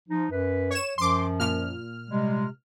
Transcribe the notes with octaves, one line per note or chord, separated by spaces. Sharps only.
F3 D#4
F#2 B4
C#5 E7
F#2 F3 C6 D6
A#2 F6
C3 G3 G#3